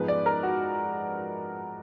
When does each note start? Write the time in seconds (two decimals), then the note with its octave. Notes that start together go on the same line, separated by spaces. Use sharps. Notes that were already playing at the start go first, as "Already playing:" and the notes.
Already playing: G#2 F3 G#3 B3 D#4 B4
0.08 D5
0.26 A#4
0.43 F#4